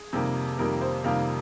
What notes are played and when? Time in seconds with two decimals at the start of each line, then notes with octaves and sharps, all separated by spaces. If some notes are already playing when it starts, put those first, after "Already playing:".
Already playing: G#4
0.13 F2 C3 D#3 G3 A#3
0.58 F2 C3 D#3 G3 A#3 A#4
0.81 C5
1.04 F2 C3 D#3 G3 A#3 F5